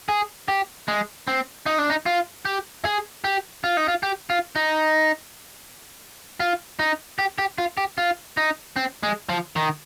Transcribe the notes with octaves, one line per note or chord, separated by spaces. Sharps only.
G#4
G4
G#3
C4
D#4
D4
D#4
F4
G4
G#4
G4
F4
D#4
F4
G4
F4
D#4
F4
D#4
G4
G4
F4
G4
F4
D#4
C4
G#3
F3
D#3